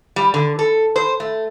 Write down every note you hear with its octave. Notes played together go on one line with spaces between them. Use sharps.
G3
D3
A4
C5
A3